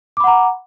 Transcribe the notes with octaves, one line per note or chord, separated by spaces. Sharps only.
F#5 A#5 B5 D6